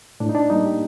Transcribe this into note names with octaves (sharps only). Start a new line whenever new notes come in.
A2 D4
D#4
D4
G3 A#3 D#4
G4